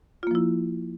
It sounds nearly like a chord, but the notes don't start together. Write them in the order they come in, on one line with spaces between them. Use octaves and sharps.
F4 A#3 F3 E4